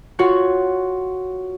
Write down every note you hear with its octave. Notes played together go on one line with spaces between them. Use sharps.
F4 F#4 C#5 F#5